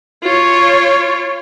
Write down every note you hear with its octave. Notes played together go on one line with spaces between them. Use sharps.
F4 C#5